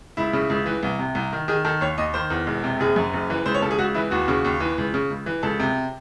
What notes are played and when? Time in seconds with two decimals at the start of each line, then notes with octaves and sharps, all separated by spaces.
0.17 C#2 E4
0.33 C#3
0.50 C#2
0.66 E3
0.83 C2
0.99 C3
1.15 C2
1.33 D#3
1.48 D#3 G#4
1.65 D#3 A4
1.81 D#2 C#5
1.98 D#2 D#5
2.14 D#3 C5
2.30 E2
2.47 E1
2.64 C3
2.80 F#1 G#4
2.96 F#2
3.14 F#1
3.30 E3
3.46 C#2 C5
3.54 C#5
3.62 C#3 A4
3.71 G#4
3.78 C#2 F#4
3.95 E3 E4
4.11 D#2 F#4
4.28 C#3
4.45 D#2
4.60 E3
4.78 C#2
4.94 C#3
5.10 C#2
5.26 E3
5.43 C#2 A4
5.60 C3